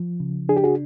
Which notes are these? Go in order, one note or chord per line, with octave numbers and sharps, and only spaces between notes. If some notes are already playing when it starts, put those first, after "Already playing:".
Already playing: F3
C#3
D4 G#4
G4
F#4 G#4